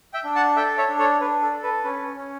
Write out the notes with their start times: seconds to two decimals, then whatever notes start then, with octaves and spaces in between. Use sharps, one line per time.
0.14 E5 G5
0.24 D4
0.35 F#5 A5
0.56 A4 E5 G5
0.78 C#5 E5
0.88 D4
0.99 A4 C#5
1.21 D4 B4
1.42 A4
1.53 A4
1.63 B4
1.84 C#4 B4
2.16 C#4